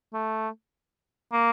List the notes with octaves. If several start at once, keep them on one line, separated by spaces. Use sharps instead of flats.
A3
A#3